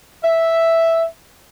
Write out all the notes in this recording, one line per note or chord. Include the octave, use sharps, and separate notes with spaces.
E5